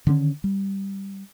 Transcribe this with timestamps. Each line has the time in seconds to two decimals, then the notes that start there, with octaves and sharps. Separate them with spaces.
0.07 D3 D#3 A#3 C#4
0.44 G3